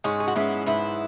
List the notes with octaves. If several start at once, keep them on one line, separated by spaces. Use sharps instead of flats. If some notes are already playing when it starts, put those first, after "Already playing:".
G#2 G#3 C#4
G#4
F#4
G#3 B3 C#4 E4
G#2 B3 E4